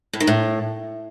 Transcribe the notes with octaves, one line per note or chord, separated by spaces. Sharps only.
A2
D#3
A2